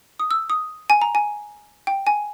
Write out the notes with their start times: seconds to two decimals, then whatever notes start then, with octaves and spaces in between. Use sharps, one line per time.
0.20 D#6
0.31 E6
0.50 D#6
0.90 G#5
1.02 A#5
1.15 G#5
1.87 G5
2.07 G#5